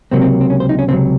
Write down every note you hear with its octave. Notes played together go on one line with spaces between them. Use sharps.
C#2 C3 F#3 A#3 C4
C4
C4
C#4
C5
D#4
C#4
C#2 C3 F#3 C4